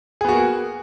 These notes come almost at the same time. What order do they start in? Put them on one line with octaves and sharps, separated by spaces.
G#4 B3 F#4 A#3